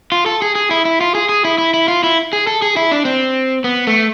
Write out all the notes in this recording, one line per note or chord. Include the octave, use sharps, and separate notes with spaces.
F4
A4
G#4
G#4
E4
E4
F4
G#4
G#4
E4
E4
E4
F4
E4
G#4
A4
G#4
E4
D4
C4
B3
A3